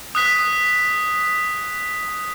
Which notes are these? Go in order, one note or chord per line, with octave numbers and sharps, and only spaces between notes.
D#6 F#6 B6